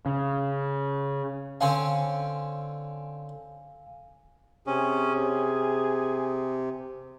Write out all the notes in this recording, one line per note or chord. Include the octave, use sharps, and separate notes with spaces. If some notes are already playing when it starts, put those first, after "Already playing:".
C#3
D3 C4 C#4 F5 G#5
C3 C#4 G#4
C3